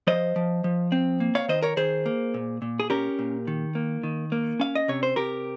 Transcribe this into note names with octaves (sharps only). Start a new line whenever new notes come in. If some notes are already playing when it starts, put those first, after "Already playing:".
F3 C5 D#5
F3
F3
C4
A#3
C#5 F5
D#3 C5 D#5
A#4 C#5
D#3 G#4 C5
A#3
A#2
A#2
G#4
C#4 G4 A#4
A#2
D#3
A#3
D#3
A#3
C#4 F5
D#5
C3 C#5
C5
C3 G4 A#4